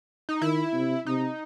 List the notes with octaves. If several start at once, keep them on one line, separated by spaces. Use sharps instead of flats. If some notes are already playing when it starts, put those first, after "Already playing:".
D#4
D#3 E4
C3
C3 D#4